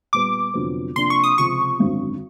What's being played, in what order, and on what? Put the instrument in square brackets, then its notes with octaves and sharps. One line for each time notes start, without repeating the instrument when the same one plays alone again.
[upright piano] A#2 G3 B3 [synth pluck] D6
[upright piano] F1 F2 D3 F#3 B3
[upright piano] C3 F3 A#3 D4 [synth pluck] C6
[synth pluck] C#6
D#6
[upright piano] C#2 C3 F3 [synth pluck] C#6
[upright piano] G#1 F#2 D3 F#3